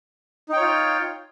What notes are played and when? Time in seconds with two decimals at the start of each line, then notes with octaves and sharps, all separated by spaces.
0.49 D#4
0.53 G5
0.57 C#5
0.61 F4